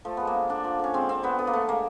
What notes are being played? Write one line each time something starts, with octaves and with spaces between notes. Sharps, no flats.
F3 A3
G#3 B3
A#3
D3
D3 D4
F3
D3 C#4
G#3 C4
F3 C4
D3 B3
D3 B3
A#3
D3 A3
G#3 A#3